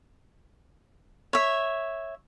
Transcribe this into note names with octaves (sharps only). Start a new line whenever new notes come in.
C#5 E5